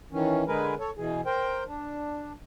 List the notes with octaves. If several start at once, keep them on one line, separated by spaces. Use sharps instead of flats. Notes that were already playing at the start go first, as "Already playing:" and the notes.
D#3 E3 C#4
D3 G#3 G#4 A#4 B4
A4 C#5
B2 E3 G#4
A#4 C5 G5
D4